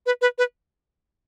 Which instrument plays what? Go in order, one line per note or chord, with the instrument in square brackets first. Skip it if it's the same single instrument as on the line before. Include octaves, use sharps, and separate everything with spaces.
[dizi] B4
B4
B4